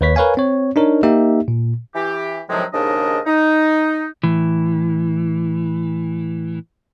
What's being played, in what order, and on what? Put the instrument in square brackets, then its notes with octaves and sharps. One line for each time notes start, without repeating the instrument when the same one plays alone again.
[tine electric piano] D#2 A#3 B4 C#5 B6
A#4 B4 C#5 F5 G#5
C4 C#5
D4 D#4 A#4 C#5
A#3 D#4 G4 E5
A#2
[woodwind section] E3 G4
A2 C3 D#3 F3 F#3 G#3
D#2 G#2 C#3 D4 A#4 D#5
D#4
[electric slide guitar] A2 E3